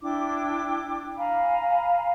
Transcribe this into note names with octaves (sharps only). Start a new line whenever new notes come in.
D4 E4 G5 D6
F5 G#5 A#5 B5